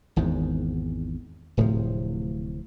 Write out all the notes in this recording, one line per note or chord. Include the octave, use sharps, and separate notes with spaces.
G#1 E2 G#2
D1 A2 C3 F3